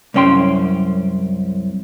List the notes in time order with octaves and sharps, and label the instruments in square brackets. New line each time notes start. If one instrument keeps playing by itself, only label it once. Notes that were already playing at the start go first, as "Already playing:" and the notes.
[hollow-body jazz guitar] C2 F#2 C#4 G5 C6